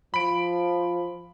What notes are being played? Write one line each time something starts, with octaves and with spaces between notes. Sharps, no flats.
F3 B5 D7